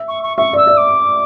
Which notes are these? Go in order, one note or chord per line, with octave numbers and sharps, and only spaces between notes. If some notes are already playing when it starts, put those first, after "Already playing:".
Already playing: E5
C#6
C#6
E5 C#6
D5 E6
D5
D6